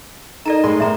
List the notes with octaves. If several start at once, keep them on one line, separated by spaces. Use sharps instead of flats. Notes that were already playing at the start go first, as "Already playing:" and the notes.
D#4 A4 A#4 D5 D#5 A5 A#5
A2 G#3 C6
A2 D#3 E5 A#5